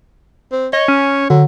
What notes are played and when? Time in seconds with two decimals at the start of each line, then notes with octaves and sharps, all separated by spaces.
0.52 C4
0.73 C#5 D#5
0.88 C#4
1.30 D3 F#3